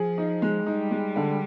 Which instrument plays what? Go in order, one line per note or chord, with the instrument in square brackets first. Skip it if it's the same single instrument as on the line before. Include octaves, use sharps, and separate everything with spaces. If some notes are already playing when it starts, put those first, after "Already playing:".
Already playing: [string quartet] F3 [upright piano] G#4
[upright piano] D#4
G#3
[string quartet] G3 [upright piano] D#4
[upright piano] G#3
D3